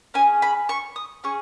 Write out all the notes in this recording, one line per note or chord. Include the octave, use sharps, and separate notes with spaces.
C#4 G#4 G#5
B5
C#6
D#6
C#4 G#4 C#6